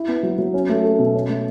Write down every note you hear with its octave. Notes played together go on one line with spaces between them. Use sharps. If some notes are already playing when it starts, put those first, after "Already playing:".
Already playing: E4
B3
F#3
F#3
C#4
A3
A4
B2
C#4
A3